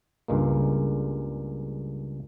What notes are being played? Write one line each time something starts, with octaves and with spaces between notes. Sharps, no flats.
C#2 G2 G#3 A#3